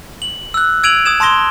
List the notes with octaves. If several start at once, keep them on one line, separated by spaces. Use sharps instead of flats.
F#7
E6 F#6
E6 G#6 D7 D#7 F7 F#7
D#6 G#6 E7
A5 C6 D#6 A#6 G7